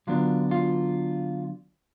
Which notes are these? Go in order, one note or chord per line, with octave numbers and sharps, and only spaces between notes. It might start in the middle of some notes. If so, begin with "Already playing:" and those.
D3 F#3 B3 D4 F4
F4